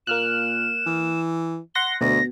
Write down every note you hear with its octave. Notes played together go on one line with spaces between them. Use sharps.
A#2 A#3 F6 F#6 E7
E3
F#5 C6 A#6 G7
D2 B2 A#6